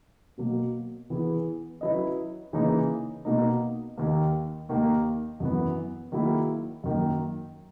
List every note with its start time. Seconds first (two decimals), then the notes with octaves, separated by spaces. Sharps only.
0.38 B2 F#3 A#3
1.10 E3 B3 E4 G#4
1.81 F#3 C#4 E4 B4 D#5
2.53 C#3 E3 A#3 D#4 G#4
3.25 B2 A#3 D#4
3.98 D#2 D#3 A#3
4.69 D#2 D#3 A#3
5.40 F#2 E3 B3
6.12 D#3 F#3 A#3 E4 G#4
6.84 F#2 D#3 F#3 A#3